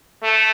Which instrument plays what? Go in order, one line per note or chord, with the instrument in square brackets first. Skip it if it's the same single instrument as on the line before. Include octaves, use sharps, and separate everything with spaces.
[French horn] A3